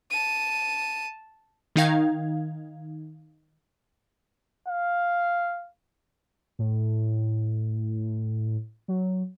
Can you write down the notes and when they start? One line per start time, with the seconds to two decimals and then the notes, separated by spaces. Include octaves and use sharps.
0.11 A5 D#7
1.76 D#3 D#4 F5 G#6
4.68 F5
6.59 A2
8.88 F#3